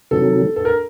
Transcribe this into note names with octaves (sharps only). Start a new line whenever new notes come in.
C3 D#3 F#3 A4
A4
A#4